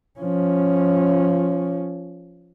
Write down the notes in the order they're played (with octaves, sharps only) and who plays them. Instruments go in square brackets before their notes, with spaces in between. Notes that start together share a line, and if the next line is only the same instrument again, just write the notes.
[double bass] F3 C#4